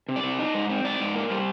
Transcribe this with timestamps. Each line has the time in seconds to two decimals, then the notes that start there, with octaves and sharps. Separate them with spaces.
0.09 C3
0.16 D5
0.23 C3
0.39 D#4
0.54 G#2
0.70 C4
0.84 G#2 D5
1.00 G#2
1.15 A#3
1.30 G3 C5